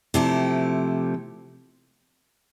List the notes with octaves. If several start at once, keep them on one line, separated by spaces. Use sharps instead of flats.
C3 F3 A3 E4 G4